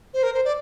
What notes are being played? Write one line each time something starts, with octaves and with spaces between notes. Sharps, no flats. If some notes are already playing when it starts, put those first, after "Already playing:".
C5
A#4
C5
D5